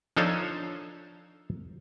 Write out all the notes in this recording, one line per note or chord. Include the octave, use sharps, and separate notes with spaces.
F3 D4 D#4 A4 C5 C#5